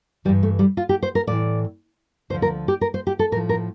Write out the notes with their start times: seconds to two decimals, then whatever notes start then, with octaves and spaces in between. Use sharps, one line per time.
0.25 E3 G3
0.29 G2
0.43 A3
0.59 G3
0.77 F4
0.89 G4
1.03 C5
1.15 A#4
1.27 A2 E3 D5
2.30 D2 D3 F3 C5
2.42 A#4
2.68 G4
2.81 A#4
2.94 C5
3.07 G4
3.19 A4
3.32 A2 A#4
3.36 F3
3.49 A#4